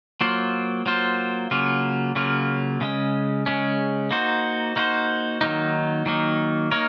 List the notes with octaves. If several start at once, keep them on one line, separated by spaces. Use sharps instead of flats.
F#3 A#3 F4 C5
F#3 A#3 F4 C5
C#3 F#3 A#3 F4
C#3 F#3 A#3 F4
C#3 G#3 C#4
C#3 G#3 C#4
A#3 D#4 F#4 C5
A#3 D#4 F#4 C5
D#3 F#3 A#3 D#4
D#3 F#3 A#3 D#4
A#3 D#4 A#4 C#5